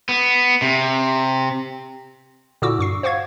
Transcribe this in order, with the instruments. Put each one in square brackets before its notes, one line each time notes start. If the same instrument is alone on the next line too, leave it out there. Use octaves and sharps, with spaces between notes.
[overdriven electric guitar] B3
C3
[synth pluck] A#2 D3 E4 F#4 D6 E6
G2 C#6 C7
C5 F5 F#5 C#6 G#6